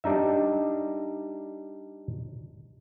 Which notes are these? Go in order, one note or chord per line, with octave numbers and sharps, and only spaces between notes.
G3 D4 D#4 E5